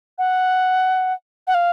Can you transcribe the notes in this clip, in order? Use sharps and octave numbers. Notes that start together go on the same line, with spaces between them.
F#5
F#5
F5